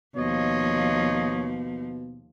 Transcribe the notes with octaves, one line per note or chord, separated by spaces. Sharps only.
D#2 B2 F3 C#5 D#5